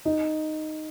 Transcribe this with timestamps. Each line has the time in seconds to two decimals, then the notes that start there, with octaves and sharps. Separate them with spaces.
0.05 D#4